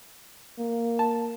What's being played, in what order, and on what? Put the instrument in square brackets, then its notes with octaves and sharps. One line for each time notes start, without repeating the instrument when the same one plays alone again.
[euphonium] A#3
[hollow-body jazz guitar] A5